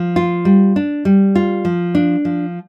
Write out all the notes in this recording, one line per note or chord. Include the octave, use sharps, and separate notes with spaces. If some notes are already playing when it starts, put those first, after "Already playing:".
Already playing: F3
F4
G3
D4
G3
F4
F3
D4
F3